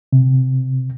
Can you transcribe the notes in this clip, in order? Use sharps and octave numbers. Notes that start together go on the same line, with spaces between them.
C3